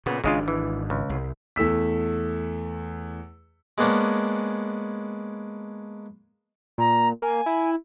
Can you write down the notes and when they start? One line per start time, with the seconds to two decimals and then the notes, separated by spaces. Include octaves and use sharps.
0.06 A#2 C#3 B3
0.24 G#1 G#2 C#3 G#3 D4 F4
0.48 E3
0.90 C#2
1.09 C2
1.56 E2 A3 E6 B6
3.78 G#3 A#3 B3 C#4 D4
6.78 A#2 A#5
7.22 A#3 G#5
7.46 E4